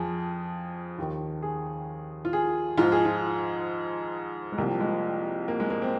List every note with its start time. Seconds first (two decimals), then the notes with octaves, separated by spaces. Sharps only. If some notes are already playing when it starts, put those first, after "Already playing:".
Already playing: F2 F3 F4 G#4
0.98 D#2 D#3
1.42 G#4
2.25 F4
2.33 G#4
2.77 G#2 F3 F4
2.92 G#4
3.05 F4
4.52 G#3
4.58 C2 C3 F3 A#3
4.80 G#3
5.48 A#3
5.60 G#3
5.70 A#3
5.82 C4